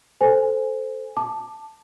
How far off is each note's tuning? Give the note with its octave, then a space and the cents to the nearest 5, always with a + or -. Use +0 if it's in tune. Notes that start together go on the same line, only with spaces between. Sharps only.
A4 +0 C5 -10 G#5 +0
A5 +0 D6 +20